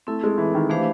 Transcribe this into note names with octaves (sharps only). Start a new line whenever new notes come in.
A3 C4 E4 A4
G#3
E3
D#3
E3 A3 D4 G4 C5 F5